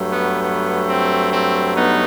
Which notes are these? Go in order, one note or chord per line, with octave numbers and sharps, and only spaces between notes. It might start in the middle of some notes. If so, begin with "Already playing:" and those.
Already playing: G2 F#3 A3
B3
B3
C4
C4
B3 D#4